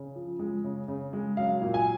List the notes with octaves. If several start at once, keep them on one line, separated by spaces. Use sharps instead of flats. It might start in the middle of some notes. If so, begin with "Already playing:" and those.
Already playing: C#3
F3
G#3
C#3
C#3
G#3
F#3 F5
A#2
G#5